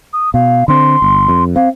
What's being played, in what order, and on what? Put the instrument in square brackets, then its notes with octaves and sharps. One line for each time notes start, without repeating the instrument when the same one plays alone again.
[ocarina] D#6
[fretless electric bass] B2 [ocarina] F5
[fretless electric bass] D3 C4 [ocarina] C6
[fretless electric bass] G1
F2
[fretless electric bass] C4 [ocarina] F5